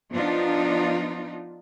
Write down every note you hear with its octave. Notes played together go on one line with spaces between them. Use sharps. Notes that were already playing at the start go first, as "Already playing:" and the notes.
F3 B3 D4 D#4 F4